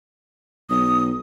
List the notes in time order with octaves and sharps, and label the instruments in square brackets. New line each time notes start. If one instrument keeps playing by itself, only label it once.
[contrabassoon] B1 [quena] D#6